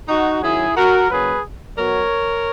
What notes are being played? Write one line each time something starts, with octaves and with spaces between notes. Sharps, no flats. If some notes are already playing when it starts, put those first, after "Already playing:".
D#4 F#4
D#3 F#3 C#4 E4 G#4
F#4 A#4
C#3 F#3 A#3 C#4 G#4 B4
B2 F#3 B3 A#4 C#5